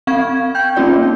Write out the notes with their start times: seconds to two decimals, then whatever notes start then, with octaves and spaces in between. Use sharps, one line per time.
0.07 C4 F5 C#6 G#6
0.55 G5 G6
0.76 A#3 C4 C#4 D#4 F4 D5